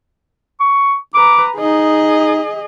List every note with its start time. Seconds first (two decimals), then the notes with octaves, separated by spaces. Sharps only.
0.60 C#6
1.14 B4 A#5 D6
1.57 D#4 G#4 D#5